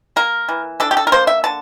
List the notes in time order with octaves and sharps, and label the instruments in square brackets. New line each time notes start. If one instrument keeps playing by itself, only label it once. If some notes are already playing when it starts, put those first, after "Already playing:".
[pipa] A#3 A#4
E3
D4 A4
G4
A4
A#4
A#3 C5
E5
D3 A5